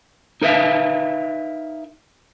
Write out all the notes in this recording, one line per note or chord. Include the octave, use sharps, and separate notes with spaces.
D#4 A#4 B4 E5 F5